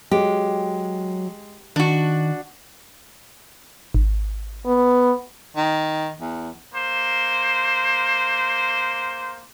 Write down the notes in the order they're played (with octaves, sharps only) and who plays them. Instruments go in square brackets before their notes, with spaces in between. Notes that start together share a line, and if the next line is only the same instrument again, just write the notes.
[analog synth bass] F#3 [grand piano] G#3 [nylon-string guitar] G4
[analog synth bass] D#3 [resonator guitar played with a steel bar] D4 F#4
[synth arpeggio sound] G#1
[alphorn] B3
[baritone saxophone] D#3
E2
[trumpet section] A#3 C5